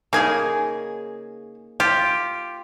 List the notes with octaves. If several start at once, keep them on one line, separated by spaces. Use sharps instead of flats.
C#3 A#3 D#4 G#4 G#5
F4 G4